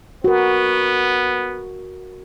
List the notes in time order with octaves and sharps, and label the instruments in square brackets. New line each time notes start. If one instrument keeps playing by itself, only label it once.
[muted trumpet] B3 [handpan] F#4 A#4